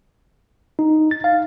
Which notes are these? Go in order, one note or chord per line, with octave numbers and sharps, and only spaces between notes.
D#4
A6
F5